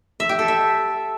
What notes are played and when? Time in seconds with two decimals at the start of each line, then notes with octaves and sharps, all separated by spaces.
0.20 E5
0.29 G4
0.39 A4
0.48 E5